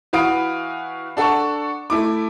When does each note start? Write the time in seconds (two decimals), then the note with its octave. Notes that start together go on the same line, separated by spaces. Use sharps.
0.13 E3 F#4 B4 F5 D#6 D7
1.17 D4 A4 F#5 A5 C#6
1.90 A3 E4 D6